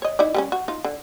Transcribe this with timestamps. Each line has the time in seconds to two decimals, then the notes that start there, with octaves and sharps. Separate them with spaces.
0.02 C#5 D#5
0.19 D#4 E4 D5
0.35 G3 B3 C#4
0.52 F#4
0.68 D#4 F4
0.85 D3